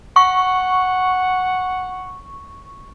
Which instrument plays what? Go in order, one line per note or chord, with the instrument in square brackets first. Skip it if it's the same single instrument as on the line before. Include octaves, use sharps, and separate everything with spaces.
[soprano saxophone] F#5 [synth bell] C#6